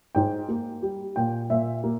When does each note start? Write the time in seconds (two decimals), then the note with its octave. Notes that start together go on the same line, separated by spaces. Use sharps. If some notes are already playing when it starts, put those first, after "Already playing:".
0.15 G#2 G5
0.48 A#3
0.83 G3
1.16 A#2 G5
1.50 A#2 E5
1.84 A#3